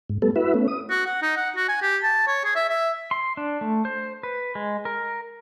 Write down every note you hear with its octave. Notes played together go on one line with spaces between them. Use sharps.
G#2
G3 A3 B3 A4
E4 F#4 B4 E5
A3 B3 C#4
D#6
F#4
F#5
D#4
F#5
F#4
G#5
G4
A5
C#5
G#4
E5
E5
C6
D4
A3
C5
B4
G#3
A#4